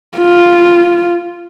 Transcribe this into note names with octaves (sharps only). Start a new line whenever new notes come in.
F4